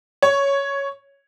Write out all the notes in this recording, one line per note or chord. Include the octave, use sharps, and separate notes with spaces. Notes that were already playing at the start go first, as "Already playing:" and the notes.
C#5